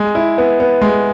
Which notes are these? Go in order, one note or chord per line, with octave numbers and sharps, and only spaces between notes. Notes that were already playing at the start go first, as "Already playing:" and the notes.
Already playing: G#3
E4
B3
B3
G#3